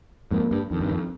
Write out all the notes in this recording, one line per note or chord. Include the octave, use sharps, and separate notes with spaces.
F2 G#2 A#3
G2
F2 D#3
G2
F2